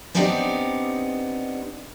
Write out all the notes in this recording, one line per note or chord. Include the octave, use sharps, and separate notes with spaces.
B3 C4 D4 D#4 G4 D5